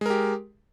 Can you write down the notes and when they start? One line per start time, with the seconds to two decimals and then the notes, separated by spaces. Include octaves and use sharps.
0.01 G#3
0.06 A#4
0.10 G4